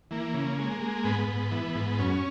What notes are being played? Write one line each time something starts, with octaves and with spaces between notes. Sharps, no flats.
E3 A#3
C#3
G#3
G#3
G#2 B3
G#2
E3
G#2
F#2 C#4